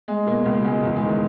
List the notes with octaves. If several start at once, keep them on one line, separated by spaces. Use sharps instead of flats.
G#3
B2 A#3
C#2 A#3
C#2 G#3
E2
G#3
D#3
G#3